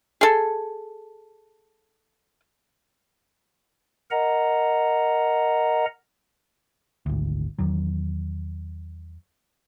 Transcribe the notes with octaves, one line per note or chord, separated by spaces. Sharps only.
G#4 A4
A#4 D#5 F#5 A#5
G#1 D2
E2 D#3 F#3